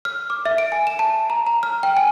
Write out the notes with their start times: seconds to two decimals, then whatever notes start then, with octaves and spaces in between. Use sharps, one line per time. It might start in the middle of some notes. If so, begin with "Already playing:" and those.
0.05 F6
0.30 D6
0.46 E5
0.58 D7
0.72 G#5
0.87 E7
0.99 A5
1.30 A#5
1.47 A#5
1.63 F6
1.83 G5
1.97 G#5